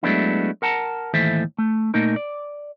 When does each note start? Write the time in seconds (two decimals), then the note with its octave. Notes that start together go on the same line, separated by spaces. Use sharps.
0.03 F#3 G#3 A3 B3 D4 E4
0.62 A#4 F#5 A5 A#5
1.14 D#2 A2 E3 A4 C5 E5
1.58 A3
1.94 A#2 A3 A#3 D#4 A#4
2.16 D5